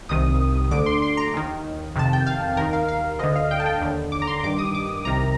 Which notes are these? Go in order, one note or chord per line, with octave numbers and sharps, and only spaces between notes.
C2 C3 D#3 D#6
D2 D3 D6
C6
C6
A#5
D#2 D#3
F2 C3 D#3 A5
G5
F5
D#2 D#3 A#4
F5
F5
D2 D3 D#5
F5
G5
A5
G5
D#2 D3
D6
A#5
C6
G2 D#3 D6
D#6
D6
C2 C3 D#3 A#5